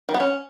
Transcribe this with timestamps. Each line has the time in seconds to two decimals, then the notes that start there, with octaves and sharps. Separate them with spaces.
0.09 D#3
0.14 B3
0.20 C#4